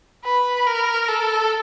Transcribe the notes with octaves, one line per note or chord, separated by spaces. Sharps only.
B4
A#4
A4